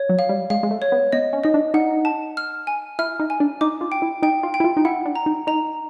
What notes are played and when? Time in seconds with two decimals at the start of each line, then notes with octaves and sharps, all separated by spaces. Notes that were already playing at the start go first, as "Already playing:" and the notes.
Already playing: C#5
0.09 F#3
0.19 F5
0.29 G3
0.50 G#3 F5
0.63 G#3
0.71 A3
0.82 C#5
0.92 B3
1.13 B3 D#5
1.33 C#4
1.44 D#4 D#5
1.54 D4
1.74 D#4 F#5
2.05 A5
2.37 F6
2.67 G#5
2.99 E4 F6
3.20 D#4
3.30 G#5
3.40 D4
3.61 D#4 D6
3.81 F4
3.92 G5
4.02 E4
4.22 D#4 G5
4.43 F4
4.54 G5
4.60 E4
4.64 F4
4.77 D#4
4.85 E4 F#5
5.06 D4
5.16 A#5
5.26 D#4
5.47 D#4 A#5